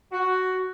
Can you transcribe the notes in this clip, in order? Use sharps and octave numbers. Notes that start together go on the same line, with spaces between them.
F#4